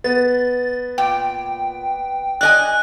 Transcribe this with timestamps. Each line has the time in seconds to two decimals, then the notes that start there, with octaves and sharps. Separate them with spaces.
0.04 B3 A6
0.98 A#2 G5
2.41 D5 D#5 G#5 F#6